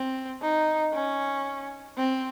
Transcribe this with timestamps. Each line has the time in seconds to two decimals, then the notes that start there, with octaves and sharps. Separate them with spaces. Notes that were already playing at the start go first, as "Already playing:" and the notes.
Already playing: C4
0.42 D#4
0.94 C#4
1.98 C4